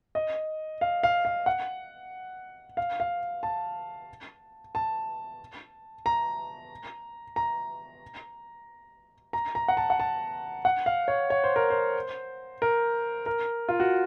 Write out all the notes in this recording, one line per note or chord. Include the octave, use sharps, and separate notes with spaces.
D#5
F5
F5
F5
F#5
F5
F5
A5
A5
A#5
A#5
A#5
A#5
F#5
A5
F#5
A5
F#5
F5
C#5
C#5
C5
A#4
C5
A#4
A#4
F4
F#4